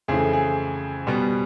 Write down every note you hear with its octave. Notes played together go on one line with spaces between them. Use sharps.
F2 C#3 E3 A3 G#4
G#4
B2 G3 B3